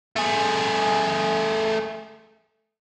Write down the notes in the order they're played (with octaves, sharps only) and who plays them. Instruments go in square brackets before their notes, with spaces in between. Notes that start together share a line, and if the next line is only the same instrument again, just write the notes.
[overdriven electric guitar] A3 G#4